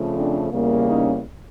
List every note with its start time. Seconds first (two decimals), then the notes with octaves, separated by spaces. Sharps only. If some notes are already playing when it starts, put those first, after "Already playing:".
Already playing: F2 C#3 F3 A3
0.15 C4 D4
0.52 E2 C#3 E3 G3 A#3
0.87 C#4 D#4